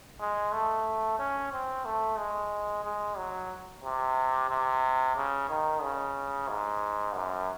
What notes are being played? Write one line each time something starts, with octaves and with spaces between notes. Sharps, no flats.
G#3
A3
C#4
C4
A3
G#3
G#3
F#3
C3
C3
C#3
D#3
C#3
G#2
F#2